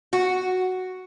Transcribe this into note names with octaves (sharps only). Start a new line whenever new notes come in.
F#4